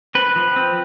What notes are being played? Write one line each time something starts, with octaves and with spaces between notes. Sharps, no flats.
C4 B4
F3
C4